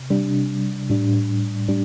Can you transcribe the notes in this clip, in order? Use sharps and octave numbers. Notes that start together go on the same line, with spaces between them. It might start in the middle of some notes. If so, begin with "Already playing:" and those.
Already playing: C3
C3 G3 D4
A2 G3 D4
A2 G3 D4